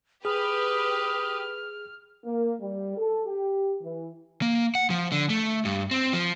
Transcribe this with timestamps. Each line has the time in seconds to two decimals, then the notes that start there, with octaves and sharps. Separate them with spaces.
0.25 G4 G#4 B4 D#6 F6
2.25 A#3
2.61 G3
2.97 A4
3.26 G4
3.82 E3
4.42 A#3
4.75 F#5
4.90 F3
5.12 D3
5.30 A3
5.65 G2
5.91 C4
6.13 F3